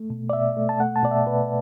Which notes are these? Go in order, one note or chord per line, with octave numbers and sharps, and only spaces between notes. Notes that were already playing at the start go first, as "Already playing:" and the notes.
Already playing: A3
B2
D5
B2 E5
A3
A5
A3 F#5
A5
B2 D5
E5
B2 B4